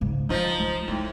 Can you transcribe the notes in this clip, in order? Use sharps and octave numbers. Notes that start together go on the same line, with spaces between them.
G#2 C#3
D3 F3 D#4
D#3 G#3
A2 G#3 D#4